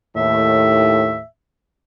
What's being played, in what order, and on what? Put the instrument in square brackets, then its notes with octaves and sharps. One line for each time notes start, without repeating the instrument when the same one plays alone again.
[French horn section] D#2 A2 [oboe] E5